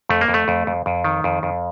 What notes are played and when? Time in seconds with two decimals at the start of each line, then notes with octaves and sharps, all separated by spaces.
0.09 F2 A3
0.21 A#3
0.28 F2
0.34 A3
0.48 F2
0.67 F2
0.86 F2
1.04 D#3
1.24 F2
1.43 F2